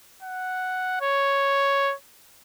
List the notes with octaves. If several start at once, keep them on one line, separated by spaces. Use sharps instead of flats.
F#5
C#5